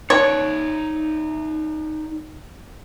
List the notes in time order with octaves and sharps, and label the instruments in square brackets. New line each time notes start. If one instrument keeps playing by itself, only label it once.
[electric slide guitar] D#4 D5 [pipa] C#5